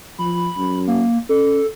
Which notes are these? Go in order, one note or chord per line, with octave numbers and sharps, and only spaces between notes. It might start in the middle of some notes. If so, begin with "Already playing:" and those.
F3 B5
F#2
A#3
C#4 A4